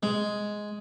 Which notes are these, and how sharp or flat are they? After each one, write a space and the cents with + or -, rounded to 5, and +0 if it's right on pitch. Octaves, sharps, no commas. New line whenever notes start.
G#3 +5